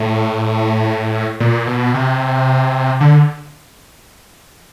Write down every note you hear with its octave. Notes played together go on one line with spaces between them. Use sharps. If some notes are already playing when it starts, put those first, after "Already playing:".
Already playing: A2
A#2
B2
C3
D3